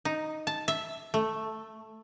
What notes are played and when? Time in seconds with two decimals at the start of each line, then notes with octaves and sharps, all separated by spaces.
0.05 D#4
0.47 A5
0.68 E5
1.14 A3